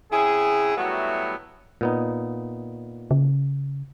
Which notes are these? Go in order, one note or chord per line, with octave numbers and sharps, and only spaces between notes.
C#3 C4 E4 G#4
F#3 G3 A3 B3 E4 F#4
A#2 B3 D#4
C#3